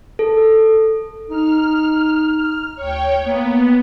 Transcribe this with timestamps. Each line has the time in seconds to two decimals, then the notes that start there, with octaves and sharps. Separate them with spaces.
0.19 A4
1.29 D#4 F6
2.75 D2 C#5 G5
3.23 A#3 B3